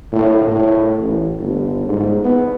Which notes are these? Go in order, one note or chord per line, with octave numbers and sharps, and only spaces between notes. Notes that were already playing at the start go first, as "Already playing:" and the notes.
A2
A2
A1
G1
G#2
B3